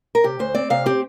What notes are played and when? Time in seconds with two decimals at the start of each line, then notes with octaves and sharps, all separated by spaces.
0.15 A#4
0.24 C3 G4
0.39 D2 C5
0.55 C4 D5
0.70 C3 F5
0.86 C4 G4